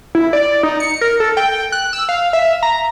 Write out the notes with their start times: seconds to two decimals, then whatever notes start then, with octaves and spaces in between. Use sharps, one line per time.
0.15 E4
0.33 D5
0.63 D#4
0.80 C#7
1.01 A#4
1.20 A4
1.37 G5
1.72 F#6
1.93 E6
2.09 F5
2.33 E5
2.63 A#5